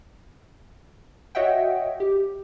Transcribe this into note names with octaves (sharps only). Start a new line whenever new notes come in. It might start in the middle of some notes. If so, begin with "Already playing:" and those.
F#4 C#5 D#5 E5 F#5 G5
G4